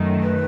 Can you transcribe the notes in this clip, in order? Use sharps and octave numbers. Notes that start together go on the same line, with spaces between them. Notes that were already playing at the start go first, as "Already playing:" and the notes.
Already playing: F#2 D#3 A3
B4